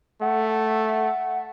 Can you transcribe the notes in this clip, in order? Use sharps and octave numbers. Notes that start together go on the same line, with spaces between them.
A3 F#5